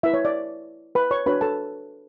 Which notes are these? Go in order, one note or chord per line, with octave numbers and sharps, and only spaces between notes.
E4 B4 E5
C#5
D5
B4 B5
C#5 C#6
D4 F#4 B4 C#5 B5
A4 A5